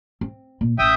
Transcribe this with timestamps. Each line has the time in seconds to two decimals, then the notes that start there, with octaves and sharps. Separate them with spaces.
0.21 C4
0.61 A#2
0.79 A1 E5 G5 D#6